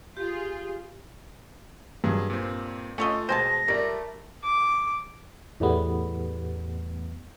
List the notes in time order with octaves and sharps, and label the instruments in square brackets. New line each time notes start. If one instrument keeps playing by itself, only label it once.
[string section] F4 G#4 [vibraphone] G4
[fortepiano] G2 [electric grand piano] F#3 G#4
[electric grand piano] A#2 C4
[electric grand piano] A3 F4 E6 [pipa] C#4 C#5 D#5
[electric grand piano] B2 G#3 [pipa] C5 G#5 A5 [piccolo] A#6
[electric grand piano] G3 [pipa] A3 [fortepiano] A#4 D5
[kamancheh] D6
[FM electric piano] E2 A2 G3 B3